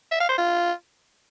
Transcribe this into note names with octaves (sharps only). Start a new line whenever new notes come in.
E5
F5
C5
F4